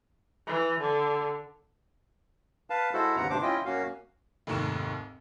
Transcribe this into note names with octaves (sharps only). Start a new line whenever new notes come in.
E3
D3
B4 F5 A5
G#3 E4 F#4 A4 C5
D#2 G#2 C#3 B3 F#5 A#5
D2 G2 C3 D4 C5 D6
C#4 E4 F4 D#5 G5
F#2 A#3 C#4 F#4 F5
F1 D#2 G#2 C#6 E7